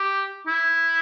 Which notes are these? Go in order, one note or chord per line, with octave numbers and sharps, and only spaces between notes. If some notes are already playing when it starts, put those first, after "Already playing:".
Already playing: G4
E4